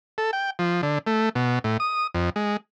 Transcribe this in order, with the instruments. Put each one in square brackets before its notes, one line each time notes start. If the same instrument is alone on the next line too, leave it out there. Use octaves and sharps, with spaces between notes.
[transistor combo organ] A4
G5
F3
D3
A3
B2
A2
D#6
F2
G#3